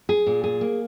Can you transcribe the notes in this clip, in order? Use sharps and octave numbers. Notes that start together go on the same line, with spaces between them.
G#4
A#2
G#4
A#3